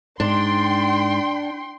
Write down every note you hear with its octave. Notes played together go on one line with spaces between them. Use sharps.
G#2 D4 G5 C6